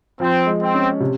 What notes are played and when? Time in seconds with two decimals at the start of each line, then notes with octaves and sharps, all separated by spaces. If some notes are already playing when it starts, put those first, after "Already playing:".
0.20 F3 C4
0.47 G#3
0.61 C4
0.74 C#4
1.00 C3